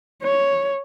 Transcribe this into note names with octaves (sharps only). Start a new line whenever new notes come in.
C#5